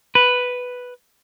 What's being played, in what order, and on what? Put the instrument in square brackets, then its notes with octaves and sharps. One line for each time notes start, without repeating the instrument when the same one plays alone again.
[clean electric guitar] B4